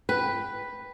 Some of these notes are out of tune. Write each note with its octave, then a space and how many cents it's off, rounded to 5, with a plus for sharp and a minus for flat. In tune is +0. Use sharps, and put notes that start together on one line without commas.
B4 +0 G5 +5